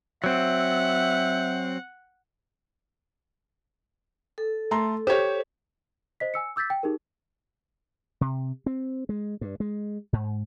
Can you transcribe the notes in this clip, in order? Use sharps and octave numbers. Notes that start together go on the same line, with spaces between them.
F#3 C4 E5 F#5
A4
A3 A#5 C6
G4 C5 C#5
C5 D#5 B6
G#5 E6 C#7
D6 E6 G6 A6 B6
G5
D#4 G4 G#4 A#4
C3
C4
G#3
G2
G#3
G#2